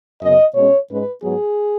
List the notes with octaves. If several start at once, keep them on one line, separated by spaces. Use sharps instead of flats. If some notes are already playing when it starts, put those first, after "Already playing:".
F#2 C#3 B3 D#5
B2 G#3 C#4 C#5
G#2 G#3 C#4 B4
G#2 F#3 B3 G#4